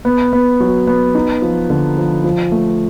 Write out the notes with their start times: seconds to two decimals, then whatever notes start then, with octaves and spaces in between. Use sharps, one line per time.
0.05 B3
0.33 B3
0.60 F#3
0.87 B3
1.15 D#4
1.42 F3
1.70 D3
1.98 F3
2.24 F3
2.52 A3